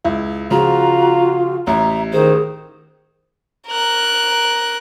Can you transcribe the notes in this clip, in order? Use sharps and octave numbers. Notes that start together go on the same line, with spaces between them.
C#2 E4
C#3 F3 F4 F#4 A#5
A1 E5 A#5
D#3 G#4 C5
A#4 F#6